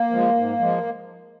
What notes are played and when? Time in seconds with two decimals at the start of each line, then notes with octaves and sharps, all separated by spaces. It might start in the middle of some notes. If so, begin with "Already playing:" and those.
Already playing: A#3
0.10 F3 G#3
0.34 G#2
0.59 F3 G#3